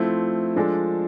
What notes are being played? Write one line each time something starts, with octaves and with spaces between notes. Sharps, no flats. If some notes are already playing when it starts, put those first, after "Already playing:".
Already playing: F3 A3 C4 E4
F3 G#3 D4 A4